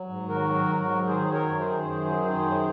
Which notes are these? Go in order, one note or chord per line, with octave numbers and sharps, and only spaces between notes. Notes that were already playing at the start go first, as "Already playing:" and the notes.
Already playing: F#3
G#2
D#3 F#4 A#4
F#3
G#2
F#3
D#3 G#4 C5
F#3
A#4 C#5
F#2
G#4 C5
D#3
F#2
F#3
D#3
F#2